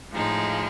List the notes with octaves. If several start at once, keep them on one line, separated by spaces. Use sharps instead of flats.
A2 F3 G#3 D#4